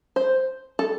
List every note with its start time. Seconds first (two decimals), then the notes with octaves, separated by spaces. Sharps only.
0.16 C5
0.79 A4